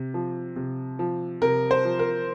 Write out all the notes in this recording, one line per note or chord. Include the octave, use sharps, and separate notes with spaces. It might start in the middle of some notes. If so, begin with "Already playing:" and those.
Already playing: C3
F3
C3
F3
C3 A#4
C5
F3
A#4